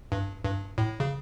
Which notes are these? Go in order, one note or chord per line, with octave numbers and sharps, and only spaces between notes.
G2
G2
A2
C#3